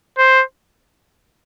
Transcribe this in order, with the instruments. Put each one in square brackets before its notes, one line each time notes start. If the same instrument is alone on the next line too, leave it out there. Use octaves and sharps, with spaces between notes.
[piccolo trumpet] C5